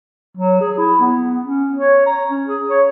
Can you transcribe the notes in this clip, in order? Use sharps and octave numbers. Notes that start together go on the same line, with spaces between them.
F#3
G#4
E4
B3
C#4
C#5
A#5
C#4
G#4
C#5